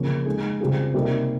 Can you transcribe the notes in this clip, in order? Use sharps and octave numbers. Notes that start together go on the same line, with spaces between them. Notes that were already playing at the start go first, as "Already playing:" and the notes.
Already playing: C#3 F3 A#3 C#4
G#3 D#4 G#4
C#3 G3 C4 F4 G#4
C3 G3 A#3 D#4